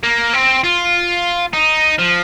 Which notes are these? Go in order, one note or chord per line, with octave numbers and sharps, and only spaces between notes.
A#3
C4
F4
D#4
F3